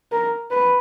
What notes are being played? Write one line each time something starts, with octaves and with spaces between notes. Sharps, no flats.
A#4
B4